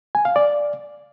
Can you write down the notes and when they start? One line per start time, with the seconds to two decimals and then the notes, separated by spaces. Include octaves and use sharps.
0.15 G#5
0.25 F5
0.36 D5